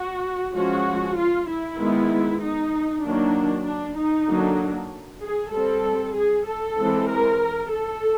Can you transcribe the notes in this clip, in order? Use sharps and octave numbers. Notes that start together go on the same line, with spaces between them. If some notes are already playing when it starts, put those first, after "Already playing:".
Already playing: F#4
F3 G#3 C#4 F#4
F4
E4
D#3 G#3 B3
D#4
D#3 F#3 A#3 D4
D4
D#4
D3 F#3 A#3 D4
G#4
G3 C4 A4
G#4
A4
E3 G#3 C4
A#4
A4